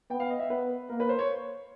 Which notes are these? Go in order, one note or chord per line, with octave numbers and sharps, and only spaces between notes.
B3 G5
F5
D#5
E5
B3 B4
A#3 A#4
B4
C5
C#5